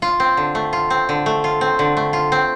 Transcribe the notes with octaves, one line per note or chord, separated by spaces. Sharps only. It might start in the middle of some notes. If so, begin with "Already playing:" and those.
F4
C4
D3
A3
F4
C4
D3
A3
F4
C4
D3
A3
F4
C4